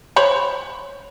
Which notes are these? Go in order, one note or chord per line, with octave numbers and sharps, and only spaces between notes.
C5 C#5 B5